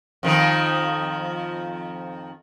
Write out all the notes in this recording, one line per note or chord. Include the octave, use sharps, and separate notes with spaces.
F2 D#3 F3